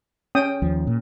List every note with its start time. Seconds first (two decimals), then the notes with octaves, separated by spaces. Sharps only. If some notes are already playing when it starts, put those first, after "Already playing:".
0.35 C#4 G5 D#6
0.62 D#2 F3
0.87 A#2